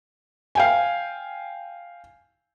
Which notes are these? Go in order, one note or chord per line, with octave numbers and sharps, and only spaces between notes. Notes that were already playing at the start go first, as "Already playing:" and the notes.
F5 G5 G#5